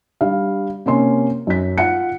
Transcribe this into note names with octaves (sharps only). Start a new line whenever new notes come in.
G3 D4 F5
C3 A#3 C#4 C6
F#2 B6
F4 F#5 C#7